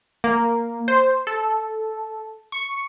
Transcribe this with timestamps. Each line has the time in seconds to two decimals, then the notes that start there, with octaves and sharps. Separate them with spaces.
0.24 A#3
0.88 C5
1.27 A4
2.52 C#6